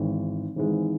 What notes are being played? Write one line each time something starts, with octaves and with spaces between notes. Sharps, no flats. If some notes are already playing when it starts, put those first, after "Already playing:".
Already playing: G#1 G#2 E3 G#3
G#1 G#2 E3 G#3